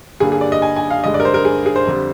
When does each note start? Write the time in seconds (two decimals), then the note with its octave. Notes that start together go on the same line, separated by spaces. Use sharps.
0.20 G2 D3 G3 A#3 G#4
0.32 G#4
0.41 D5
0.52 D#5
0.62 G#5
0.76 G#5
0.90 F5
1.04 G2 D3 G#3 D#5
1.14 D5
1.20 A#4
1.25 C5
1.34 A#4
1.45 G#4
1.66 G#4
1.76 C5
1.87 F2 D3 G3